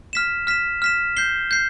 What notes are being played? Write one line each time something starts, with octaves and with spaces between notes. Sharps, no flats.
F6 B6 E7
F6 B6 E7
F6 B6 E7
G6 C7 G7
G6 C7